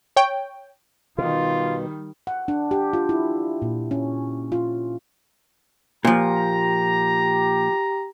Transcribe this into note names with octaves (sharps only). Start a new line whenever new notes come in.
C#5 G5
B2 D#3 G3 F4
F#5
D4
G4
F4
E4
A#2
C#4
F4
A#2 F3 G4 A#5